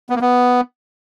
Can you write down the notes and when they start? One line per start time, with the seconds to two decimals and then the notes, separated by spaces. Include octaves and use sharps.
0.10 B3
0.16 A#3
0.21 B3